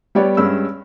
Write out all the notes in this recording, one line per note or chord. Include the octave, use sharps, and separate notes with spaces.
G3 B3 G4 C#5 D5
G2 G#3 C#4 B5 E6